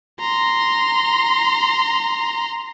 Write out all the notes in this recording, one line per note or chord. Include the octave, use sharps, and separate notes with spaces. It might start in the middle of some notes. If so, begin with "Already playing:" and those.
A#5 C6